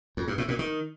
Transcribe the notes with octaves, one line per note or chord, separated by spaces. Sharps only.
F2
G2
A2
A#2
D#3